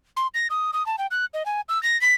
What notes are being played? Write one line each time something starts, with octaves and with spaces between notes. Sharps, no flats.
C6
A#6
D#6
D#6
A5
G5
F#6
D#5
G#5
E6
A#6
B6